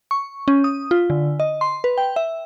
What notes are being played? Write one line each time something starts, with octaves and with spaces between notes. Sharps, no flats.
C#6
C#4
D#6
F4
D3
D#5
C6
B4
G5
E5